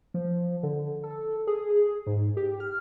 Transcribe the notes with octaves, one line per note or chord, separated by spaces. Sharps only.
F3
D3
A4
G#4
G#2
G4
F6